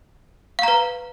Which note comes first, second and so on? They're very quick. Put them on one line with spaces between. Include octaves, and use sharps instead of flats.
F5 A#5 B4